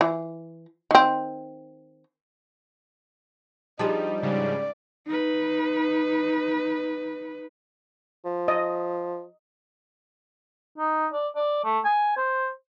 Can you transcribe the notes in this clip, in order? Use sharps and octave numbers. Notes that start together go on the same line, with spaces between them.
E3
D#3 C4
F3 G3 D4 D#4 G4 G#4 A5
G#2 C#3 G3 D5
D#4 B4
F3
D#5
D#4
D5
D5
A3
G#5
C5